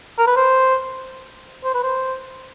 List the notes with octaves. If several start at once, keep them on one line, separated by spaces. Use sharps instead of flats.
A#4
B4
C5
C5
B4
C5